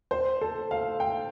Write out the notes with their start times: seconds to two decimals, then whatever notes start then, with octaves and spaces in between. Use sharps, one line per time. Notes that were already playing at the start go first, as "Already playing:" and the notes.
0.11 C5
0.41 A4
0.71 F5
1.00 G5